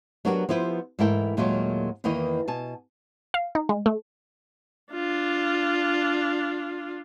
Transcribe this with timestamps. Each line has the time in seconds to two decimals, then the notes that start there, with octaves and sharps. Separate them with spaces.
0.25 F#3 B3 D4 F#4 G4 A#4
0.49 F3 B3 E4 B4 C5
0.99 G#2 E3 A3 E4 A#4 G5
1.37 D#2 A#2 F#3 G#3 A3 F4
2.04 E2 D#3 E3 A#3 D#5
2.48 B2 G#5 A5
3.34 F5
3.55 D#4
3.69 G#3
3.86 A3
4.93 D4 F4